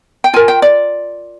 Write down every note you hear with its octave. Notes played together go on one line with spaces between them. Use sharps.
G5
F4 A#4 G#5
G5
D5